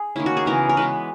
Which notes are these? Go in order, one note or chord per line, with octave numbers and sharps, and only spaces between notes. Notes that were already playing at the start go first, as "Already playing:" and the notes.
Already playing: G#4
D#3 A#3 C#4 E4
F#4
G#4
C#3 E3 B3 A#4
A#4
E3 G#3 B3 B4